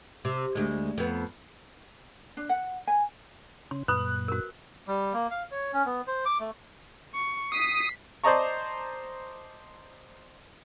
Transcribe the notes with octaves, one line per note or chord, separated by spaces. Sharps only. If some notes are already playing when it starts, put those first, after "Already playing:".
C3
D2 G#3
F2 B3
D4
F#5
G#5
C#3 C#4 C6
F#2 A#2 B4 B5 D#6 F#6
F#4 A#4
G3
A#3
F5
C#5
C#4
B3
C5
D6
A3
C#6
D#6 B6 C7
C5 D5 D#5 A5 A#5 C#6